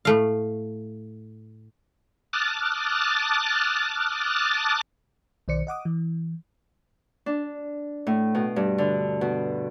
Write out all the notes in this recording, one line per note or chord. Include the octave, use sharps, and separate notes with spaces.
A2 A3 F5
A5 D6 D#6 F6 F#6 A6
B1 D#3 C5 D5 C#7
D#5 F#5 D6 D#6
E3
D4
A2
B2
G2
D3
B2